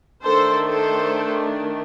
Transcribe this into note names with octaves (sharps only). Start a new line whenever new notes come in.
D#3 A3 D4 A4 C5
A4 C5